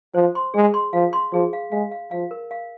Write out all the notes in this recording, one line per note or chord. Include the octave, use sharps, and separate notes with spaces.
F3 C5
C6
G#3 G#4
C6
F3 F5
C6
F3 G#4
F5
G#3 F5
F5
F3 F5
A#4
F5